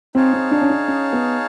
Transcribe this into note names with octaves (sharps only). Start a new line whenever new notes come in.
C4 D#4 G#4 C#5 F5 A5
C4
D4
C#4
D4
C#4
B3